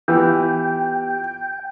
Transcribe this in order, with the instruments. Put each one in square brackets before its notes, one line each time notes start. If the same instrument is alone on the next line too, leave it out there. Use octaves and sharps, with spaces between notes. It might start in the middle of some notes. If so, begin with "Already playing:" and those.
[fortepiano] E3 [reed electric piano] B3 F4 G4 [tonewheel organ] G5